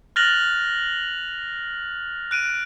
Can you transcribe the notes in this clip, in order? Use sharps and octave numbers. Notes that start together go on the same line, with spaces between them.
F6 F#6 A6 A#6 F7 F#7
F#6 D7 D#7